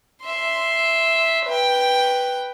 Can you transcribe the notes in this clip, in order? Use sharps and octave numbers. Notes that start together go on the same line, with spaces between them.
E5 C6
B4 G5